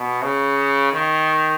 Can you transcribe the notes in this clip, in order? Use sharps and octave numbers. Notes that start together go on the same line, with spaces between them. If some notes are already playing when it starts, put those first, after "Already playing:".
Already playing: B2
C#3
D#3